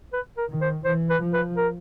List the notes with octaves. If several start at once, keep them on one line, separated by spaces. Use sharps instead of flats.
B4
A#4
D#3
C5
E3 C5
B4
F3
B4
A#4